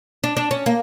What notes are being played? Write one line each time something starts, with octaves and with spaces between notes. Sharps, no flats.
D4
D4
C#4
A#3